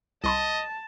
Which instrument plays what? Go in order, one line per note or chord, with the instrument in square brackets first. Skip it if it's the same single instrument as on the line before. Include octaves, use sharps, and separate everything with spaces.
[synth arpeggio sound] C2 B5 C6 [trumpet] D#5 [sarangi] A5